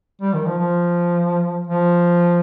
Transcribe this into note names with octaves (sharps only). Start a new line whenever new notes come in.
G3
D#3
F3
F3
F3